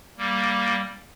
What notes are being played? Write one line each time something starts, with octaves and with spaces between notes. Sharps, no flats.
G3 A#3